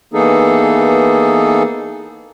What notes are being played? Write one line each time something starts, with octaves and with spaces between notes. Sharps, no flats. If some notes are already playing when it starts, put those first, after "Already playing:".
E3 A#3 B3 D#4 G#4 A4